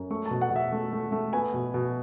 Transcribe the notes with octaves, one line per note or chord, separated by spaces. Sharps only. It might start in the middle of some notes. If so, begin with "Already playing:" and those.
Already playing: F#2
A3 C#6
A5
B2
F#5
B2
E5
A3
A3
A3
B3 G#5
B2
B2